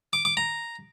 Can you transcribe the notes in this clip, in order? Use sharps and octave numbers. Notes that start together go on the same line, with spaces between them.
D6
D6
A#5